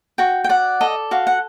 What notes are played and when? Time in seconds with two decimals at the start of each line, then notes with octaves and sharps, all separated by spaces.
0.18 F#4 G5
0.44 G5
0.49 D5 F#5
0.81 A4 D#5
1.11 F#4 F5
1.27 F#5